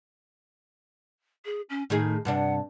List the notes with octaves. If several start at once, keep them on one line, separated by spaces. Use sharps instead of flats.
G#4
C#4
A2 D#3 D#4 G#4
G2 C3 D4 F#5